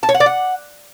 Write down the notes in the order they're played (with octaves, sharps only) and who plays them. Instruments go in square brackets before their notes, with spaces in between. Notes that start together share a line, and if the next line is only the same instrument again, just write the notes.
[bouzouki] A5
C#5
F#5
D5
F#5